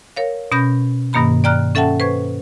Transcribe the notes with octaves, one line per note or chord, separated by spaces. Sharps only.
A#4 C#5 F5
B2 C#4 B5 G6 A#6
G2 B2 D#3 A#3 A#5 B5
D5 G5 A#5 F6 F#6
C#4 A4 E5 F#5 G5 A5
B4 C5 C#6 G#6